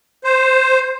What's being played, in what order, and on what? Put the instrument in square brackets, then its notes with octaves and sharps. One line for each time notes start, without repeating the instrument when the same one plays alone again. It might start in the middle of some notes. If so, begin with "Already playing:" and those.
[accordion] C5